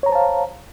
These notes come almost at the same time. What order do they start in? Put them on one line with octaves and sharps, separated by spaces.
C#5 A#5 C5 A5 F5